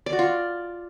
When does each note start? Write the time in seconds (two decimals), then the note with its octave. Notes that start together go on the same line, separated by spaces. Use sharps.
0.06 D5
0.13 F#4
0.19 F4